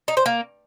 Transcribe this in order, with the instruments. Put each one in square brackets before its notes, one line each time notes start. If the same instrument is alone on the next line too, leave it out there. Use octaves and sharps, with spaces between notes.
[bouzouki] D#4
C5
A#3